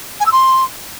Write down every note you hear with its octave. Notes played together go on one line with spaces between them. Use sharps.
G#5
E6
C6